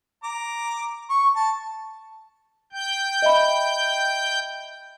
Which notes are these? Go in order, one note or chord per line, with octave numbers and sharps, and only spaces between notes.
A#5 D6
C#6
A5
G5 G6
D#5 E5 B5